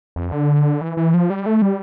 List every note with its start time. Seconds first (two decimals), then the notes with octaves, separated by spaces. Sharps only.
0.16 F2
0.32 D3
0.81 E3
0.97 E3
1.14 F3
1.30 G3
1.46 A3
1.62 G3